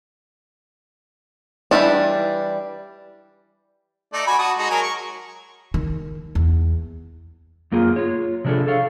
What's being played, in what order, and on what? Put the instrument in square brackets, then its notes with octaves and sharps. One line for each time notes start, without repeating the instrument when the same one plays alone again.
[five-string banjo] E3 G3 G#3 D4
[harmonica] A3 D#4 D5
F#4 G#5 B5
F#4 A5 D#6
G#3 D#4 F#4
F#3 A#4 G#5
C#6
[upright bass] D#3
E2
[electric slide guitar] F#2 A#3 F4 G#4
F4 C#5
C3 F3 D4 E4 G#4 A4
A4 C#5 F5